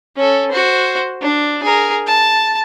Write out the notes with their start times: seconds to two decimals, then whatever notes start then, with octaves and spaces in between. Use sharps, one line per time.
0.16 C#4 A4
0.51 F#4 C5
1.21 D4
1.63 G#4 A#4
2.07 A5